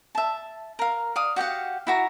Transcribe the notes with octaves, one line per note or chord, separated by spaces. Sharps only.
E5 A5
A#4 F5
D5 F5 D#6
F#4 G4 F5 F#5
E4 F#4 A#5